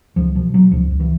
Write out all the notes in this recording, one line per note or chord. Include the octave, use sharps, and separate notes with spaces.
C#2 F3
B2 F3
B2 F#3
C#2 F3
C#2
E3